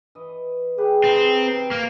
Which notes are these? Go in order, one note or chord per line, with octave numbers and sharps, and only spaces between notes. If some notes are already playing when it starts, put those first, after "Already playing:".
E3 D#5
G4 G#4 B4
E3 C4 D#4
C3
A#3